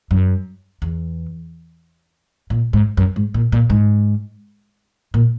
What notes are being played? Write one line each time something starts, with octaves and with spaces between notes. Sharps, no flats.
F#2
E2
A#2
G#2
F#2
G#2
A#2
A#2
G#2
A#2